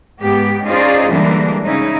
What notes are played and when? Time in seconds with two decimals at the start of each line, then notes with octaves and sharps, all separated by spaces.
0.22 G#2 B3 G4
0.65 C#4 D#4 F4 G#4 C5 D5
1.10 D3 E3 G3 G#3 A#3 D4
1.63 C#3 C#4 D#4 E4